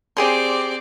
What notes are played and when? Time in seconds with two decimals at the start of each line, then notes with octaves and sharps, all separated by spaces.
0.17 C4 G4 G#4 D5 C6